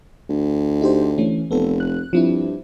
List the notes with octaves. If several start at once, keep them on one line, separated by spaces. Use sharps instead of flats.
D2
D#4 G4 C5
E3 A3 C#4
F1 B3 A4
F#6
G2 F3 C4 E4